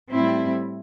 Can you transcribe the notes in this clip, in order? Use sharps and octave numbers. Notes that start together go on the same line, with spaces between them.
A2 G3 C4 E4